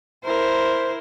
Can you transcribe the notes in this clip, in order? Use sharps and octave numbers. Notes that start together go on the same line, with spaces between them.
E4 A#4 C5